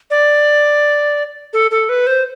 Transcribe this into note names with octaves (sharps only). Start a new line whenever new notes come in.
D5
A4
A4
B4
C5